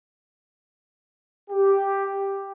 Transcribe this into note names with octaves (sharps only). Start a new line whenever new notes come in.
G4